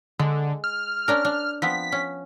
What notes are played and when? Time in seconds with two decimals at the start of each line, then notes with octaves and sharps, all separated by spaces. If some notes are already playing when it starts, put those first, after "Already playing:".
0.19 D3 G#3
0.64 F6
1.08 C#4 D4 A#4
1.25 D4
1.62 F3 B3 C4 B6
1.92 C#4